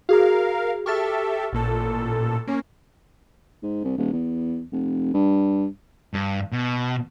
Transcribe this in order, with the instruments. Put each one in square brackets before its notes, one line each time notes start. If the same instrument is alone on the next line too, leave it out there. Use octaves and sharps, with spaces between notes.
[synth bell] F#4 G#4 [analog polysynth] A#4 F5
[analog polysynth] G4 A4 E5 [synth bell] C#6 F6 A6
[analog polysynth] A1 A#2 A4
A#3 C#4
[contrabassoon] G#2
C2
D#1
E2
F1
G2
[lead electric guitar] G2
B2